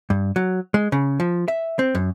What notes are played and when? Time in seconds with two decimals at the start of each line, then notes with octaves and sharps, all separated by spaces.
0.10 G2
0.36 F#3
0.74 G#3
0.92 C#3
1.20 F3
1.48 E5
1.79 C4
1.95 F#2